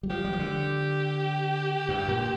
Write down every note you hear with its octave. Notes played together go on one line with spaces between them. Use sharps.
G3
F3 G4
G3
F3
D3
G2
A#2